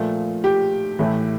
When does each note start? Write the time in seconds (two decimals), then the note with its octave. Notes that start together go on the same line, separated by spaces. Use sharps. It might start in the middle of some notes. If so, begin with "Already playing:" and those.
Already playing: A#2 F3 A3
0.44 G4
0.99 A2 E3 A3